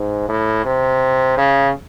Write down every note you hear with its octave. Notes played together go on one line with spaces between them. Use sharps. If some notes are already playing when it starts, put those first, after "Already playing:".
Already playing: G#2
A2
C3
C#3